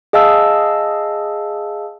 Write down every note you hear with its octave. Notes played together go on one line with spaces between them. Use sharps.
G#4 D#5 F5 A5 E6